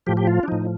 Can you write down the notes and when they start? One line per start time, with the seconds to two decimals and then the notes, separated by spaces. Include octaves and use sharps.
0.06 A2 F3 G4
0.17 G4
0.27 F4
0.43 D4
0.48 A2 F3 D#4